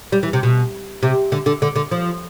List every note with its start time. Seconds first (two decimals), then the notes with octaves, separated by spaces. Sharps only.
0.12 G3
0.23 E3
0.33 C3
0.43 B2
1.03 C3
1.32 D3
1.46 D3
1.62 D3
1.76 D3
1.91 F3